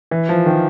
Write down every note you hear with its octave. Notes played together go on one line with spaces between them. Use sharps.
E3
F3
D#3